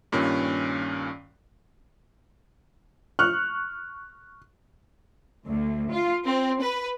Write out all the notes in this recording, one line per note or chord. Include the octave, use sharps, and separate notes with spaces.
G2 A#2 D#3 C#4
C#6 F6 F#6
D2
F4
C4
B4